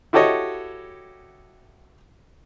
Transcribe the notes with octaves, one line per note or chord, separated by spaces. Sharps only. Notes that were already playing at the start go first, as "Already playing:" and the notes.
E4 F#4 G4 A4 C#5 D#5